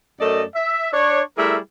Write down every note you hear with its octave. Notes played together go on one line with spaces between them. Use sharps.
F#2 A3 A4 D5 D#5
E5
D4 C#5
G3 A3 E4 G#4 A#4 E5